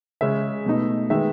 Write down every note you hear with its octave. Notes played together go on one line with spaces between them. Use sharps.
C#3 G#3 C#4 E5
B2 A3 D#4
D#3 G#3 B3 D#4 E5